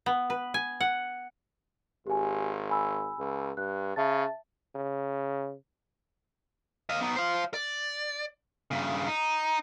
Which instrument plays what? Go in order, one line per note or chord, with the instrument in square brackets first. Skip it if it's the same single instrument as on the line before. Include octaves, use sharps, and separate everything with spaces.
[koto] B3
B4
G#5
F#5
[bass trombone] G#1 [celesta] G4 G#5
[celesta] G#5 B5 E6
[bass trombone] C#2
[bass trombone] G2 [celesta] F#6
[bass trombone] C#3 [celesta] E5 A5 A6
[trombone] C#3
[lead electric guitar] D#5 F5
B3 D#4
C5 F5
D5
G2 C#3
D#4